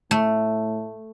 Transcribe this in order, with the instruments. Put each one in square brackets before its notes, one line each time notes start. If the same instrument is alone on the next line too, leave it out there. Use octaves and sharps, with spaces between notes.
[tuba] A2 [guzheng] A3